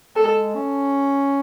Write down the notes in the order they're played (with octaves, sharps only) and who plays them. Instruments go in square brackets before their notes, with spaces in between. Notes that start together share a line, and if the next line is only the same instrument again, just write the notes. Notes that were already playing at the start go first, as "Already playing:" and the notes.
[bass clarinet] G#3 [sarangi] A4
[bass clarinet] C#4